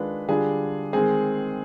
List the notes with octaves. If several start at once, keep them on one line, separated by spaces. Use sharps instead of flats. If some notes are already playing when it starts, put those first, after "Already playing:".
Already playing: D#3 G#3 D4 F4 B4
D3 G3 D4 F4 G#4
D#3 G#3 C4 G#4